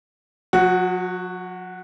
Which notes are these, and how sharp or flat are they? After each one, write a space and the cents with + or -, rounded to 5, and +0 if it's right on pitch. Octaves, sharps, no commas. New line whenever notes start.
F#3 -45 F#4 +0